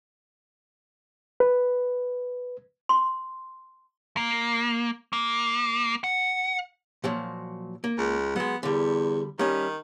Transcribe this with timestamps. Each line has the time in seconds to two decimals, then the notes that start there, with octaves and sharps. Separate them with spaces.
1.40 B4
2.89 C6
4.17 A#3
5.13 A#3
6.04 F#5
7.04 A#2 F3 F#3
7.84 A#3
7.98 C#2
8.36 F#3 G#3 B3
8.63 E2 D3 G3
9.39 D#3 G3 C#4